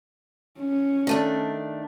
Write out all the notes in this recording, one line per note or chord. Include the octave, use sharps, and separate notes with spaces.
C#4
D#3 A3 D4